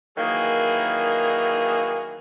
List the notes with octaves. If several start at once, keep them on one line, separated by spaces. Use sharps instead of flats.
D#3 E3 F#3 A#3 G#4